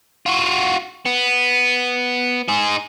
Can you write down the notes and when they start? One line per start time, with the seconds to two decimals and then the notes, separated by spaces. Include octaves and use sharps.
0.26 F4 F#4
1.05 B3
2.48 D#4 G#4